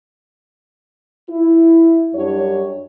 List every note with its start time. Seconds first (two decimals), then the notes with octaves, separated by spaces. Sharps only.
1.29 E4
2.14 F#2 G3 D4 C#5